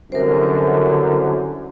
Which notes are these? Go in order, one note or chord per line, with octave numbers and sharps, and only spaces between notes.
C2 F#2 D3 A#4 C5